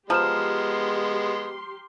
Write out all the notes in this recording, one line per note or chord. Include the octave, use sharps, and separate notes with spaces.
F3 G#3 B3 G4 A#5 C6 F6 E7